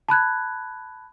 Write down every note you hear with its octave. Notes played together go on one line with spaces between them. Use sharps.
A5 B5 F#6 G#6